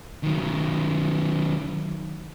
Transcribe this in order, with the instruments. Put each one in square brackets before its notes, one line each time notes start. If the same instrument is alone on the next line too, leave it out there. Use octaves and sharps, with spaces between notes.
[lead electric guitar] D#3 F#3